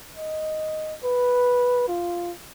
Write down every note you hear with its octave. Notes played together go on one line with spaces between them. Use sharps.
D#5
B4
F4